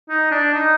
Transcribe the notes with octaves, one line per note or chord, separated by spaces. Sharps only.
D#4
D4
D#4